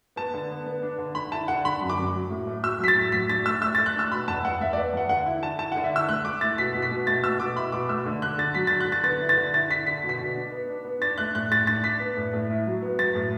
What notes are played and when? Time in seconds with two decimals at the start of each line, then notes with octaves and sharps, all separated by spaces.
0.16 B3 A5
0.34 D3
0.50 B3
0.66 B3
0.82 D4
0.98 D3
1.15 D3 B5
1.32 E4 A5
1.48 D3 F#5
1.65 D3 B5
1.81 F#2
1.90 D6
1.98 F#2
2.15 F#3
2.30 A2
2.47 A3
2.63 F#3 E6
2.79 F#3 B6
2.88 A6
2.96 A2
3.12 F#3 B6
3.29 D4 A6
3.45 A3 E6
3.62 A3 E6
3.75 A6
3.78 A3
3.86 F#6
3.95 D4 E6
4.11 B2 B5
4.27 E2 A5
4.45 E2 F#5
4.61 E2 E5
4.73 D5
4.78 B3
4.93 E2 F#5
5.09 D3 F#5
5.26 E4
5.43 D3 A5
5.59 E4 A5
5.72 F#5
5.76 D3
5.84 E5
5.92 E4 E6
6.08 A3 F#6
6.25 A3 D6
6.41 E4 A6
6.58 B2 B6
6.75 B2
6.82 B6
6.91 B2
7.07 A3 A6
7.24 B2 E6
7.40 B2 D6
7.56 E4 B5
7.72 B2 D6
7.89 A3 E6
8.06 D3
8.22 D4 F#6
8.38 D3 A6
8.55 F#3 B6
8.67 A6
8.71 D3
8.80 F#6
8.87 D3 A6
9.04 B3 A6
9.21 E4
9.29 A6
9.37 D3
9.54 E4 A6
9.70 E4 B6
9.87 D3 B6
10.03 B2
10.09 B6
10.19 B2
10.36 D4
10.52 B3
10.69 D4
10.85 B3
11.02 D4 A6
11.18 A3 F#6
11.35 A2 F#6
11.51 A2 A6
11.67 D4 A6
11.84 D4 B6
12.00 B3
12.17 A2
12.33 A2
12.50 E4
12.67 F#3
12.82 B3
12.99 F#3 A6
13.15 A2